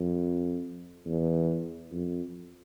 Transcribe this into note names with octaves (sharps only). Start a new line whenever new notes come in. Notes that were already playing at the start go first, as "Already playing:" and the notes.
Already playing: F2
E2
F2